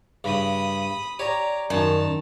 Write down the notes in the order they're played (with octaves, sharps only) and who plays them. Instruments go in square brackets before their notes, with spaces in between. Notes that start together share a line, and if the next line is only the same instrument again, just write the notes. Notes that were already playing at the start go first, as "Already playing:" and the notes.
[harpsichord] G2 C#3 [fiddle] B5 D#6
[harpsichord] G4 C#5 [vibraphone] D5 [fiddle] A#5
[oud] F#2 [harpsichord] D#3 [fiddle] A5